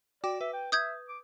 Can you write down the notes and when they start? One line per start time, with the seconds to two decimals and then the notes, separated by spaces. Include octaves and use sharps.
0.24 F#4 D5 G5 D6
0.41 B4 E5
0.53 G5
0.72 E5 D#6 G6 G#6
1.09 D6